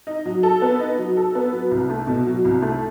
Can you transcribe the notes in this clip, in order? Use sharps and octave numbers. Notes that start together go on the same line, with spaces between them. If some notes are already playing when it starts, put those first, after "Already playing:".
D#4
F#3
A4
B3
D#4
F#3
A4
B3
F#3
C2
A3
B2
F#3
C2
A3